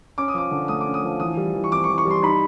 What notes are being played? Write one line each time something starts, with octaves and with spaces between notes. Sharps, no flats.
C#4 D6
D#6
F3 D6
D3
A3 D#6
D6
C#4
D#6
F3
E3 D#6
G3
E3
C#6
C4 D6
C#6
E3
C#6
G3
C6
D#4 B5